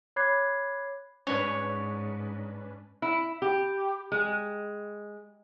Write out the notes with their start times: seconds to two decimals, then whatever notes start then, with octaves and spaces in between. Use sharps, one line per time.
0.16 C#5 B5 D6 F#6 G#6 C7
1.27 G#2 C#4 D4 B4 C#5
3.02 E4
3.42 G4
4.12 G#3